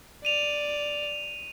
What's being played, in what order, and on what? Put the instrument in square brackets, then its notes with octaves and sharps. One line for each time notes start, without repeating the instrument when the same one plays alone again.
[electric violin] D5 [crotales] D#7 F7